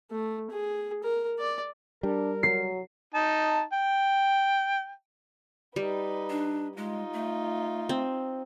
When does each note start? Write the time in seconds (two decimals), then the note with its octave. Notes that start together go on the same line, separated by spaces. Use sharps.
0.11 A3
0.51 G#4
1.04 A#4
1.39 D5
2.03 G3 D4 A#4
2.43 F#3 C7
3.14 D#4 A5
3.73 G5
5.76 G3 D#4 B4
6.30 D4
6.77 G#3 D#4 F4
7.13 A3
7.89 C4